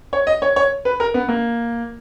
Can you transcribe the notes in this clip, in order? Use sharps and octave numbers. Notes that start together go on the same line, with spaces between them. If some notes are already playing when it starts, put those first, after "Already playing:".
C#5
D#5
C#5
C#5
B4
A#4
B3
A#3